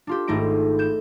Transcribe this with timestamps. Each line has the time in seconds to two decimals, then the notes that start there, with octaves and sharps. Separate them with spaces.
0.07 D4 F4 G4
0.28 G#1 G#2 A3 D#4 D#5 D7
0.79 G6 E7